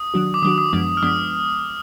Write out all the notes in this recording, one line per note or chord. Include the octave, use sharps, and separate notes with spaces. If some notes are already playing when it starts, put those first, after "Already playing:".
Already playing: D#6
D#3 F#3 D4 F#4
D6
D#3 F#3 D4 F#4 D#6
D#6
F#2 F3 G#3 B3 D4 D6
F6
F#2 F3 G#3 B3 D4 D#6